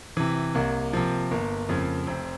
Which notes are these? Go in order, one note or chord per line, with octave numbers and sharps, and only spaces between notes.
C3 E3
C2 A#3
C3 F3
G1 A#3
F2 C#3 F3
F1 C4